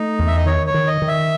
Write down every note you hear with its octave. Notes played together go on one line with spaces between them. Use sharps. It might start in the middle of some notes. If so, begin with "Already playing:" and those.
Already playing: A3 D#4
E2
E5
D#5
D#3 C#5
C#5
D#3
D#5
D#3
E5